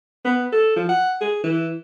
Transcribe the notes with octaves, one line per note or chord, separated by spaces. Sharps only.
B3
A4
F3
F#5
G#4
E3